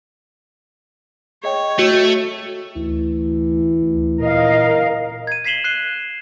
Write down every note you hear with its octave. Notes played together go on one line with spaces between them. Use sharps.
G#4 C#5 D#5 G5
A3 F#4
D2 E3
D2
A#2 A#4 D#5 F5
G#6 D#7
G#6 B6 C7 E7 F#7 G7
F#6 C7 G7